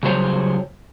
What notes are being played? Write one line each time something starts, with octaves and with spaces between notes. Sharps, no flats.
C#3 F#3 G3 C5 C#5